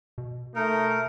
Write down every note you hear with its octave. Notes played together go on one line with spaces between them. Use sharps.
B2
A3 D#4 A#4